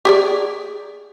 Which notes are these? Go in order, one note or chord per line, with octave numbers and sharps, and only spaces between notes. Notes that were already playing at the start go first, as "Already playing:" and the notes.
G4 G#4 D5